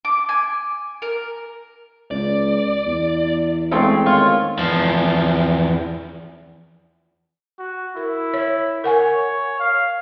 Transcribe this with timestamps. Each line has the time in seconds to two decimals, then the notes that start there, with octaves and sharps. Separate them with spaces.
0.05 D6
0.29 G#5
1.02 A#4
2.11 C#2 D5
2.86 E2
3.71 G#3 A3 C4
4.06 D#3 F4 C#5
4.58 E2 F3
7.59 F#4
7.96 E4 A#4
8.34 C#5
8.84 A#4 C#5 F#5 G#5
9.60 F5